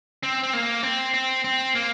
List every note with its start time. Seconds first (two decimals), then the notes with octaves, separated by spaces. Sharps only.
0.23 C4
0.43 C4
0.53 A#3
0.83 C4
1.14 C4
1.44 C4
1.75 A#3